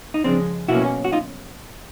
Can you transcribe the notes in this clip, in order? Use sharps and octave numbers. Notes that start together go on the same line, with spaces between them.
D#4
C#3 F3 G#3 C4 D4
B2 F#3 A#3 C#4 E4 F#4
F#4
D#4 F4